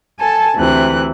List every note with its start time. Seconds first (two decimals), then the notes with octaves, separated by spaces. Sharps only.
0.19 A4 G#5 A5
0.56 D2 C3 E3 F#6